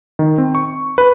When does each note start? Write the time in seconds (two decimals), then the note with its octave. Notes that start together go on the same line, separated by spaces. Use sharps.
0.19 D#3
0.38 C4
0.55 C#6
0.98 B4